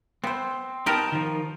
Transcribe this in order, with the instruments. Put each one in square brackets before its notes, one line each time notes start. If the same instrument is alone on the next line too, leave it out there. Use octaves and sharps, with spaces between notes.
[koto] B3 C5 [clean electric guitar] C4
[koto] B3 G4 A#4 [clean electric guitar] D#4 A5
[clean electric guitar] D#3 F3